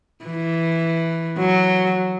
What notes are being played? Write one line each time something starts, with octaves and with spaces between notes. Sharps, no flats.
E3
F#3